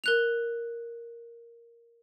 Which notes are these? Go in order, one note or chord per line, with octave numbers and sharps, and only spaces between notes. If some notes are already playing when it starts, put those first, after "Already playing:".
A#4 F#6 F7